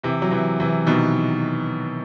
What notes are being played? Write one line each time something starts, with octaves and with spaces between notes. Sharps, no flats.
C3 E3
F#3
C3 E3
C3 E3
B2 D#3